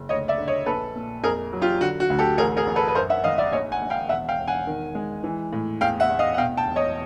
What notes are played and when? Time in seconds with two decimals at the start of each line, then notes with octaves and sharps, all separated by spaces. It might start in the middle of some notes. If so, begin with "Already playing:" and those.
Already playing: F#1
0.09 D2 C#5 D#5
0.28 D5 E5
0.38 D3
0.47 C#5 D#5
0.66 A#1 A4 B4
0.95 A#2
1.23 F2 G#4 A#4
1.53 F#3
1.61 F4 G4
1.81 D3 F#4
2.00 F#4
2.10 D2
2.19 G4 A4
2.38 A1 G#4 A#4
2.57 G#4 A#4
2.67 A1
2.76 A4 B4
2.88 B4
2.95 F#2 A#4 C5
3.10 E5 F#5
3.24 G#1 D#5 F5
3.38 D5 E5
3.52 A#1 C#5 D#5
3.72 F#5 G#5
3.81 A#1
3.90 F5 G5
4.09 E1 E5 F#5
4.29 F5 G5
4.38 E1
4.47 F#5 G#5
4.67 D#3
4.95 G#3
5.24 E3
5.53 A2
5.81 E2 F5 G5
6.00 E5 F#5
6.09 E2
6.19 D#5 F5
6.34 F#5
6.38 B2 F5 G5
6.57 G5 A5
6.67 E1
6.76 C#5 D#5